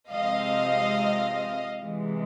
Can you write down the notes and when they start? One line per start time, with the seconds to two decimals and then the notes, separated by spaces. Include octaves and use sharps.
0.11 C3 F3 G#3 C4 D#5 F5
1.84 C3 E3 G#3